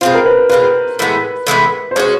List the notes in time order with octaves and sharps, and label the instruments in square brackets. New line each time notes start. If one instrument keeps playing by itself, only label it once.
[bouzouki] B2 G#3 C4 F4 [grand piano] C5
[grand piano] A#4
B4
[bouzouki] B2 G#3 C4 F4 [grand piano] B4
[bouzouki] A2 E3 G#3 B3
A2 E3 G#3 B3
[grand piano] C5
[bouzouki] G#3 C#4 F#4 [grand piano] C#5